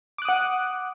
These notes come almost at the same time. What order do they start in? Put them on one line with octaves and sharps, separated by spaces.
D6 F#6 D#6 F#5